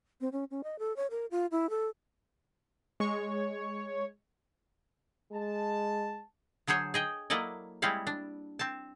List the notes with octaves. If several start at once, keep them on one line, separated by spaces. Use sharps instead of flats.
C4
C#4
C#4
D#5
A4
C#5
A#4
F4
E4
A4
G#3 C#5 C#6
G#3 A5
D3 F#3 G#4 C5 C#5
G#4 D#5 G5
F#3 A#3 E4 A4 D5 D#5
G3 G#3 C4 E4 C#5 F5
D4
C4 A5